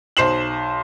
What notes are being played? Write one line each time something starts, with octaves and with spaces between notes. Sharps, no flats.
B1 C5 C7 E7 F#7